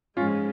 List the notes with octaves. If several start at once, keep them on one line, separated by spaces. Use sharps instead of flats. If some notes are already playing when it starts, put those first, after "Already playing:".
G#2 F3 G#3 C#4 F4